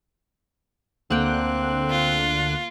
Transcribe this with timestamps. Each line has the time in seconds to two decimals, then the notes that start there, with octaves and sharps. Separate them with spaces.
1.10 D2 D3 A#3 C4 F#5 G5 F#6
1.90 F4